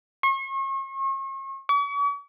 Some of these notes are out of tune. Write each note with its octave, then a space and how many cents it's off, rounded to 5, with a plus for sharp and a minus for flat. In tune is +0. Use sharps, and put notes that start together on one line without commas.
C#6 -40
C#6 +45